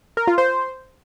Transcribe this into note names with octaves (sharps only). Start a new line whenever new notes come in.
A#4
F4
C5
C5